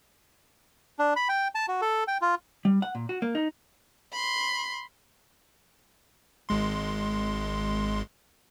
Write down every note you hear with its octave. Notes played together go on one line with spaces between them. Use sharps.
D4
B5
G5
A5
F#4
A4
G5
F4
G3
F#5
A#2
F#4
A#3
D#4
B5 C6
G#1 G#3 C6